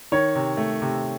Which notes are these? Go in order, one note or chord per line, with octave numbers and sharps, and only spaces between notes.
D#3 C#5
C3
A3
C3